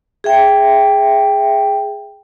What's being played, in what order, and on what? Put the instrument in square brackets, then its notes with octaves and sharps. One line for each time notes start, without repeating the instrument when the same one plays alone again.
[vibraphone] G#4 E5 G5